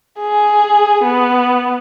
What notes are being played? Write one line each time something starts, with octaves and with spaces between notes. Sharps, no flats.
G#4
B3